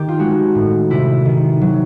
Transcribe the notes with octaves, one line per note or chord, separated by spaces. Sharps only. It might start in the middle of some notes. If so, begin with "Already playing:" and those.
Already playing: D#3 G4
F4
G#3 F#4
A2
C3 E4
D#3
F#3